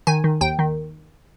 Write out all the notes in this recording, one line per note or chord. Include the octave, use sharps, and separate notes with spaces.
D#3 G#5
D#3
D#2 G5
D#3